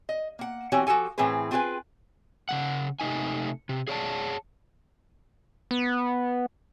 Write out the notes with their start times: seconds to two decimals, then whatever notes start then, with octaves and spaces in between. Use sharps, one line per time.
0.09 D#5
0.39 A#3 F#5
0.72 E3 C4 F#4 G4 C#5 G#5
0.87 F3 F#4 G4 A4 G#5
1.18 A2 E3 C4 G#4 B4
1.51 C4 F4 G#4 A4 B4 G#5
2.49 C#3 G#3 F#5
3.00 C3 A3 D#4 G#5
3.69 C3
3.88 G#4 C#5 D5 A5
5.71 B3